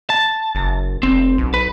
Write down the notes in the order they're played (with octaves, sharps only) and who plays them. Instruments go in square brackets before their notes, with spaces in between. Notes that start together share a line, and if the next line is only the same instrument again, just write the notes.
[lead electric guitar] A5
[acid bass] F#1
[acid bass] F1 [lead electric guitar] C4
[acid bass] B1
[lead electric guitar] B4